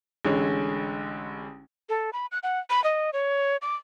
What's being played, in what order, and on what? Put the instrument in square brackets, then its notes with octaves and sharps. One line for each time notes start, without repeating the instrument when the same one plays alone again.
[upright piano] A1 D3 G#3 C#5
[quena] A4
B5
F#6
F#5
B5
D#5
C#5
D6